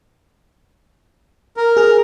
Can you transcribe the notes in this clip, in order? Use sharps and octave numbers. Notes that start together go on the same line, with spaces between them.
A#4
G#4 F6